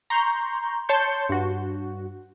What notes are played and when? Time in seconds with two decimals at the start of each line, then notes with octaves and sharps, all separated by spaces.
0.10 A#5 C6 C#6 G6
0.89 C#5 A5 C6 G6 C#7
1.29 G2 F#4